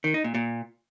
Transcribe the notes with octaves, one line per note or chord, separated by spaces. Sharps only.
D#3
D#4
A#2
A#2